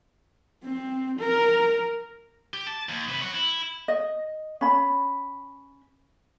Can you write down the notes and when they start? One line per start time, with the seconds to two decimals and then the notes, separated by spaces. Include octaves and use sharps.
0.63 C4
1.20 A#4
2.54 G4
2.67 A5
2.89 D#2
3.09 C3 B4
3.21 C#5 F#5
3.34 E4
3.88 D#5
4.61 C#4 B5